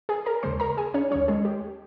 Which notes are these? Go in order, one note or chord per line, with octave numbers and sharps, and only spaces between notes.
G#4 G#5
A#4 A#5
D#2 C#3 G#3 C5 C6
A#4 A#5
G#4 G#5
C#4 C#5
D#2 D#3 G3 C#4 C#5
G#3 G#4
G4